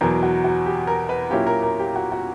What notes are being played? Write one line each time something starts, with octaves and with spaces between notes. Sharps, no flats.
E2 B2 F#3 A#4
F#4
F#4
G4
A#4
B4
A#2 F#3 A#3 C#4 E4 G4
A#4
A#4
G4
F#4
F#4